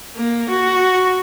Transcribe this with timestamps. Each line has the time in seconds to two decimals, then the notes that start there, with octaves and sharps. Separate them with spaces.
0.16 A#3
0.49 F#4